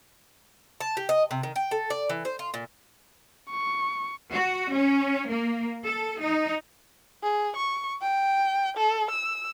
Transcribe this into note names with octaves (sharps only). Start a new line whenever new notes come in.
A5
G4
D#5
C3
D#3
G5
A4
D5
E3
C5
F4
A#2
C#6
F#4
C#4
A#3
A4
D#4
G#4
C#6
G5
A4
E6